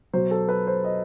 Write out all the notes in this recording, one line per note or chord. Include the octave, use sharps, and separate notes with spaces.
B2 F#3 C5
A4
B4
C5
D#5